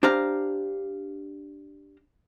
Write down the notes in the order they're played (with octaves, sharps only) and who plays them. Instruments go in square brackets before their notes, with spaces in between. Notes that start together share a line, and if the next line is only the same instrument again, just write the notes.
[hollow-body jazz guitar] D4 G4 C5 F5 A#5